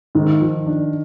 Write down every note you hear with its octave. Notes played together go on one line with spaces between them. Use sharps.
G#2 D#3
F3
D4